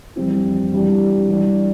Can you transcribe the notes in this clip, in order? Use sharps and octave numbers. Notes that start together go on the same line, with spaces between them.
F2 E3 G3 C4 E4
E3 G3 D4 G4
E3 G3 D4